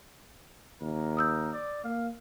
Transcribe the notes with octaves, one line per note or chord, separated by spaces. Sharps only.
D#2 A#4
D#6 E6 G6
D5
A#3 F5